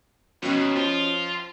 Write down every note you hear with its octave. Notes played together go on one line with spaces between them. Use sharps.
D#2 B2 C#4 D#5
F3 F4